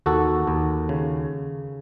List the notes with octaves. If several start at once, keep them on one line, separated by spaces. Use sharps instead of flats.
D#2 F#4 A4
D#2
C#3